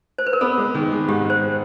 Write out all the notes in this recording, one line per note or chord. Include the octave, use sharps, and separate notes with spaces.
C5
B4
A#4
B3 A4
G#3
D#3 G#4
G#3
G#2 G4
G#3 C5